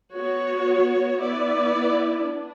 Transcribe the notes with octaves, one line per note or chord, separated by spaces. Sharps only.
B3 F#4 C#5
B3 E4 B4 D5
D4